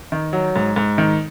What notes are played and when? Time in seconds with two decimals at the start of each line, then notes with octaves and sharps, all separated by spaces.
0.12 D#3
0.33 F#3
0.56 G#2
0.76 G#2
0.98 D#3